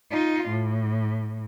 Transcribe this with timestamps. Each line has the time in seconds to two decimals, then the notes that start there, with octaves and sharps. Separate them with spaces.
0.11 D#4 F4
0.49 A2